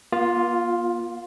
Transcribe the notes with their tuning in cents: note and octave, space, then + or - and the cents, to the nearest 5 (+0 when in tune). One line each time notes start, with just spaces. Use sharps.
A#3 +45 F4 +5